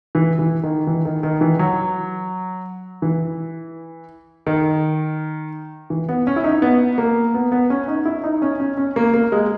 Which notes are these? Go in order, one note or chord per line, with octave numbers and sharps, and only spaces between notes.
E3
E3
D#3
E3
D#3
D#3
E3
F#3
E3
D#3
E3
B3
C#4
E4
D#4
B3
A#3
B3
B3
C#4
D#4
E4
D#4
C#4
C#4
C#4
A#3
A#3
G#3